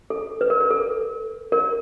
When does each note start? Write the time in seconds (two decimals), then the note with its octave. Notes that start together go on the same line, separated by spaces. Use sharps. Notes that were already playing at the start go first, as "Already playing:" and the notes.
0.10 A4
0.41 B4
0.50 A#4
0.60 A#4
0.70 A4
1.52 A#4